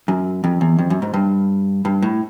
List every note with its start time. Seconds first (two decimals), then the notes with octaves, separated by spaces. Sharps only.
0.08 F#2
0.44 F2
0.61 E2
0.79 F2
0.90 F#2
1.02 G#2
1.14 G2
1.85 G2
2.02 A2